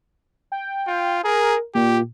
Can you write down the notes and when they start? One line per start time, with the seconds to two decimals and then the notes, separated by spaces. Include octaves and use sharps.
0.52 G5
0.87 F4
1.24 G#4 A#4
1.75 A#2 G4